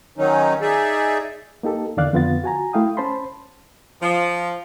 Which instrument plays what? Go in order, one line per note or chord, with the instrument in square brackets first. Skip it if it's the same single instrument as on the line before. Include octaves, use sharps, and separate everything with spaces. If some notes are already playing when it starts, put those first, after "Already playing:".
[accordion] D#3 F#3 C#4 D#4
D#4 G#4 D5 E5
[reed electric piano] A#3 D#4 G4 A4
E2 D3 D#3 D5 F5 F#6
F2 D3 B3 F4 F5 A6
F#4 G#5 A#5
A3 E4 F5 G5 D#6
C#4 C5 A5 B5 C6
[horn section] F3